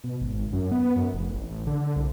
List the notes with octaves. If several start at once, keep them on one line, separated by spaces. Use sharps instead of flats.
B2
G#1
F#2
B3
F#2
F1
A1
D3
C2